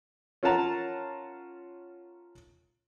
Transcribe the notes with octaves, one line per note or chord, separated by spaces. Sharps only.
C#4 F4 A#4 F#5 A5 A#5